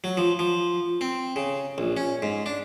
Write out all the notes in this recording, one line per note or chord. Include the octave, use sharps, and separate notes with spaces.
F#3
F3
F3
C4
C#3
A#1
C#4
G#2
D4